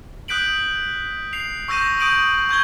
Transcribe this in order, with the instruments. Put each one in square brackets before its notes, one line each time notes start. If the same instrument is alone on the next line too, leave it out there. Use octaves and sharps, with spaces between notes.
[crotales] D#6 F#6 G6 B6 D7 F#7
C7 F7
C#6 E6 G6 A#6 D#7 E7
C#6 D#6 G6 D7 D#7 F#7
C#6 G6 G#6 G7